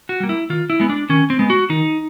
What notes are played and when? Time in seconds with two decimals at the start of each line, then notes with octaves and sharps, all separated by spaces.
0.09 F#4
0.20 G3 A#3
0.29 E4
0.50 D#3 F4
0.70 E4
0.80 G#3 B3
0.89 D4
1.09 D#3 C#4
1.30 C4
1.39 G#3 B3
1.50 F#4
1.69 D#3 D#4